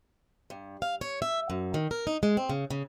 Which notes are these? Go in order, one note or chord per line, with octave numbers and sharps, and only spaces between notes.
G2
F5
C#5
E5
F#2
D#3
A#4
D#4
G#3
C4
C#3
C#3